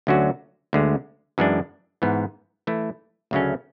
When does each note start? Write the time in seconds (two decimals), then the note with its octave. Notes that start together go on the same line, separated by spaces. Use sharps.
0.07 D2 D3 F#3 C#4 F#4
0.73 D2 D3 G#3
1.38 F#2 E3 G#3 D4
2.02 G#2 E3 B3
2.67 E3 A3 E4
3.31 D2 C#3 F#3 A3 C#4